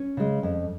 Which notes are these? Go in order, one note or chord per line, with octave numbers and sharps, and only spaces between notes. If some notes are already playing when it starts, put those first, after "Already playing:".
Already playing: C#4
C#3 G#3
F2